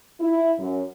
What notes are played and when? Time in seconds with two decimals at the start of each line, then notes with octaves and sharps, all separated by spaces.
0.21 E4
0.58 F#2